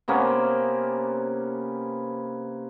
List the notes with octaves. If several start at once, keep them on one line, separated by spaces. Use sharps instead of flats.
C3 A#3 B3 C#4